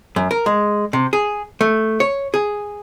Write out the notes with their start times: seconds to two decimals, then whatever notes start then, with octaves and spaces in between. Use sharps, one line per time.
0.16 F#2
0.31 A#4
0.46 G#3
0.93 C3
1.13 G#4
1.61 A3
2.00 C#5
2.34 G#4